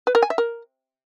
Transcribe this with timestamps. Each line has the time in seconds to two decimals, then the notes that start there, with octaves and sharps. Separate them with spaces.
0.07 B4
0.15 A#4
0.22 G#5
0.30 E5
0.38 A#4